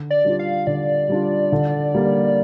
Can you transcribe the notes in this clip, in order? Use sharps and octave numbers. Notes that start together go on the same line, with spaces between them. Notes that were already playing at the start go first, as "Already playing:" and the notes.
Already playing: D3
D5
G3 D4 F4
F5
D3 D5
G3 D4 F4
D3
G3 A#3